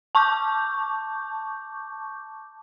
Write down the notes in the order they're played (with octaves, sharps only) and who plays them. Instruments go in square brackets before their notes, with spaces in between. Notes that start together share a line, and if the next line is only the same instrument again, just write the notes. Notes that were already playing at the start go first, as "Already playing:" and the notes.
[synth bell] A5 C#6 D6 G6